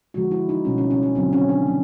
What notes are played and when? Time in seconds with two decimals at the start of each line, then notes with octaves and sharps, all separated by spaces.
0.14 D3 F3 G#3 B3 F#4
0.31 E4
0.49 D#4
0.65 B2 G3 B3 C#4
0.78 C#4
0.90 C#4
1.03 C#4
1.15 D3 F#3 B3 C4
1.33 C#4
1.49 D4
1.67 F3 A#3